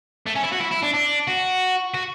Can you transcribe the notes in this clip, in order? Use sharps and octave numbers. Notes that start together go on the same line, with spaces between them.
A3
C#4
E4
F#4
E4
E4
D4
D4
F#4
F#4